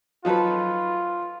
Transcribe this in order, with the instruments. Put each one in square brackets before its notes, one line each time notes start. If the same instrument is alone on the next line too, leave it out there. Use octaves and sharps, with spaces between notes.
[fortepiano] F3 F#3 [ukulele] D#4 A4 B4 [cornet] F4